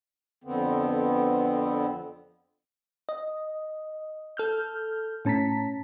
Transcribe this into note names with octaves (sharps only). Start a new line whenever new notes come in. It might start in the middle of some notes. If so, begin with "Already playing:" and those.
F2 D3 B3 C4
D#5
A4 F6 G6
A2 C#4 A5 A#5 B6